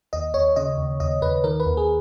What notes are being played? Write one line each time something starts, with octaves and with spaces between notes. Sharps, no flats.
D#2 D#5
D#2 C#5
C#3 D#5
D#2
D#2 D#5
D#2 B4
D#3 A#4
B4
D#2
G#4